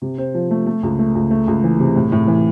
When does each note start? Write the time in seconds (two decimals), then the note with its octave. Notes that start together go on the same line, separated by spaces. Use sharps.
0.02 C3
0.18 C4
0.34 F3
0.51 A3
0.66 A3
0.83 C#2
0.99 A3
1.15 C#2
1.31 A3
1.48 C#2
1.64 E3
1.79 C3
1.96 A2
2.12 A2
2.28 E3